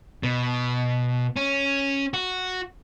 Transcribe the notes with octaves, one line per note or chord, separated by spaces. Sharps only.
B2
C#4
F#4